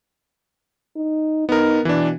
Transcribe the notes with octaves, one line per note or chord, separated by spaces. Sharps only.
D#4
B3 D#4 A#4
B2 E3 D4